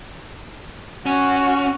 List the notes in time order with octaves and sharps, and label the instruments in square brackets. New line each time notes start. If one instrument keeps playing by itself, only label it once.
[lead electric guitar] C#4 [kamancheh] F#4